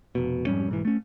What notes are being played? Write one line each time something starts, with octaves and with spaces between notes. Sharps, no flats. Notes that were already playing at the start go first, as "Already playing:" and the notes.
F1 B2
F2 G#2 G3 C#4
B1 G#2 E3
A3 C#4